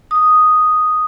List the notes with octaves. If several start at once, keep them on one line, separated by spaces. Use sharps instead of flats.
D#6